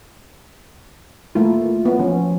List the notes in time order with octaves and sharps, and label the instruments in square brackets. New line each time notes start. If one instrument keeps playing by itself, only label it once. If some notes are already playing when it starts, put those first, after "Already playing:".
[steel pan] A3 A#3 E4 [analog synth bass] F4
[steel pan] B3
[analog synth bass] F3 [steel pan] C#4